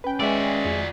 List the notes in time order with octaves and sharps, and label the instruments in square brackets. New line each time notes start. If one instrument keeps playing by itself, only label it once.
[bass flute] C#4 [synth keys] B4 G5
[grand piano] G#3 E5 [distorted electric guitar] F#4 D5
[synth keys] F2 G#4